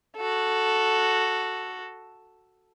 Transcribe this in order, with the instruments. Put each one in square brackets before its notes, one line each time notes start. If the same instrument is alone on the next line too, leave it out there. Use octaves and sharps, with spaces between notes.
[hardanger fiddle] F#4 A4